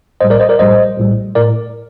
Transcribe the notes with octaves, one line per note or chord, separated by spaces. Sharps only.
A#1 A2 G3 C5 D#5
A#4 D5
C5 D#5
A#4 D5
A#1 A2 G3 C5 D#5
A#1 A2 G3
A2 A#4 D5